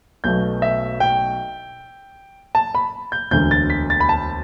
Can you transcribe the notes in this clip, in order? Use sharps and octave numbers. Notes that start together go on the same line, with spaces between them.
B1 B2 A3 G6
E5
G5
A5
B5
G6
E1 D2 D3 G6
A6
B6
A6
B5
A5